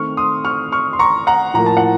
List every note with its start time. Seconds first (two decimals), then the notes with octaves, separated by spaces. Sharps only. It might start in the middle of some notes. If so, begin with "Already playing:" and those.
Already playing: D#3 A3 C4 C#6 F6
0.17 C6 D#6
0.45 C#6 F6
0.72 C#6 F6
0.93 C6
0.99 A#5 C#6
1.27 F#5 A#5
1.54 A2 F3 A#3 A#5
1.66 A5
1.77 F#5